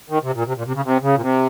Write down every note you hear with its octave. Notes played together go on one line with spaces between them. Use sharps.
D#3
C3
A#2
C3
A#2
C3
C#3
C3
C#3
A#2
C3